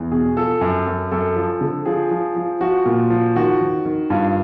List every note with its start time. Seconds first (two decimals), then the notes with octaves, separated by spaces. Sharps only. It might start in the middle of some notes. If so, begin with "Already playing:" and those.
Already playing: E2
0.11 B2 G#4
0.37 F3 A4
0.61 F#2
0.87 F#2
1.12 F#2 A4
1.36 F3
1.61 D3
1.86 F3 G#4
2.11 F3
2.36 F3
2.61 F3 F#4
2.86 A#2
3.10 F3
3.36 D#3 F#4
3.61 D#3
3.85 D#3
4.10 G2 F4